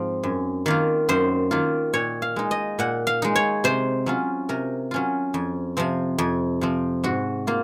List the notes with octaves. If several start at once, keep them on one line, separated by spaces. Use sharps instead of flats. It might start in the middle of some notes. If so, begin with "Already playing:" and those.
Already playing: G#2 F3 C4
F#2
D#3 A#3 F4
F#2 C5
D#3 A#3 F4
A#2 C#5
F5
G#3 D#4
D#5
A#2 F#5
F5
G#3 D#4
C#5
C3 C5
F#3 C#4 F4
C3 A#4
F#3 C#4 F4
F2
C3 F3 C4
F2
C3 F3 C4
G#2 F#4
A#3 F4